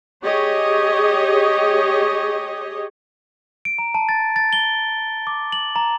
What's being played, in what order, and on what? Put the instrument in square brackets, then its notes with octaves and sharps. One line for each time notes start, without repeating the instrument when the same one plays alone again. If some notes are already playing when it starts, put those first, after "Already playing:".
[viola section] G4 G#4 C#5 D#5
[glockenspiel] D7
A#5
A5
A6
A6
G7
D6
F#7
A#5